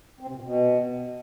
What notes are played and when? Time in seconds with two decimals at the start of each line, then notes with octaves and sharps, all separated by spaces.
0.21 C4
0.28 C3
0.36 A#2
0.43 B2